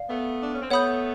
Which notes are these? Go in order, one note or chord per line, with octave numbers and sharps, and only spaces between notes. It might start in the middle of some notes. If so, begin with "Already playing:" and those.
Already playing: D5 F5
A3 B3
D4
C#4
C4
A3 B3 C#5 F#5 B5 D#6 G6